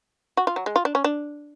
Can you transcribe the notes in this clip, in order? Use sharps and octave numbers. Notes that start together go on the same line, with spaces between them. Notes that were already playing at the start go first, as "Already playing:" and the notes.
F#4
F4
F#3
G#3
F4
D4
C#4
D4